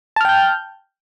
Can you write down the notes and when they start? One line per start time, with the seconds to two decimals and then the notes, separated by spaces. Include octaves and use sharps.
0.16 A5
0.21 F6
0.25 G5
0.29 G6